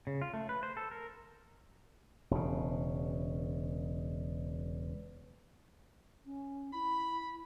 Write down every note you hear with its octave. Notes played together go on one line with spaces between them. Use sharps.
C#3
F4
A3
B4
C5
A4
A#4
E1 C#3
C#4
E4 B5